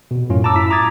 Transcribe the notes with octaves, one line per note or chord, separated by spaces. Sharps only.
B2
F#2 A2 C#4 F4
A5 A#5 D6 E6
E4 B6
A#5 D6 D#6 G#6 A6